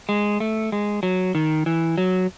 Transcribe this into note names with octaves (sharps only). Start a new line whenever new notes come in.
G#3
A3
G#3
F#3
D#3
E3
F#3